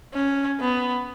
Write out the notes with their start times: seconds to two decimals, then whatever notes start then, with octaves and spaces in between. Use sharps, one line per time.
0.14 C#4
0.60 B3